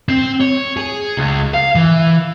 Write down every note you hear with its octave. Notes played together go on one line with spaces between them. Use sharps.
C4
C#5
G#4
C#2
F5
E3